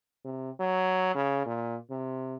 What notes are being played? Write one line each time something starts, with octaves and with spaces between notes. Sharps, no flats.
C3
F#3
C#3
A#2
C3